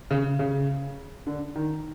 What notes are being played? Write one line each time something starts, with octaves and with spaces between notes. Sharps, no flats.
C#3
C#3
D3
D#3